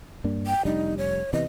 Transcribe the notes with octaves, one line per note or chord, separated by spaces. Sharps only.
G2 A#3 D4
G5
F1 G3 D4 D#4
C#5
C3 E3 B3 D#5